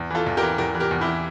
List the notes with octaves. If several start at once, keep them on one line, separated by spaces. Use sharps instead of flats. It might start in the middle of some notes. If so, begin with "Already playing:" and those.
Already playing: E2
E3 F4 A4
E2
G4 A#4
E3
E2 G4 A#4
E3
G4 A#4
E2
E4 G4
E3